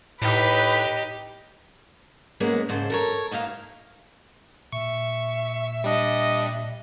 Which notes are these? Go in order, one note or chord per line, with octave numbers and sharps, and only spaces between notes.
A2 D#4 G4 B4
G#2 B2 G#3 A#3 B3 C#4
G#2 C#3 C5 A5
A4 A#4 C#5
G#2 D#4 E4 F5
A#2 E5 C#6
G3 D4 D#5 C#7